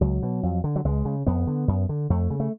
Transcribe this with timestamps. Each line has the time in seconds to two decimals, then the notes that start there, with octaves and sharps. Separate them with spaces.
0.01 C#2 F#3
0.23 B2
0.43 F2
0.64 D3
0.76 F#3
0.85 C#2 G#3
1.05 C#3
1.27 F2 B3
1.47 D3
1.68 F#2
1.89 D3
2.10 F2 A3
2.30 C#3
2.40 A3